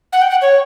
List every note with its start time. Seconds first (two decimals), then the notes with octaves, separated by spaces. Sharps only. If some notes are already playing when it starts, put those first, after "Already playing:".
0.13 F#5
0.22 G5
0.30 F#5
0.42 C#5